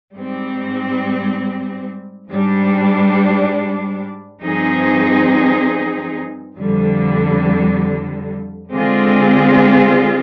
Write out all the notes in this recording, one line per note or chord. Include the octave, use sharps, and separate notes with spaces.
G#2 G3 C4
G#2 G3 D4
G2 F3 C4 D#4 G#4
F2 D3 G3
D3 G#3 C4 F4 G#4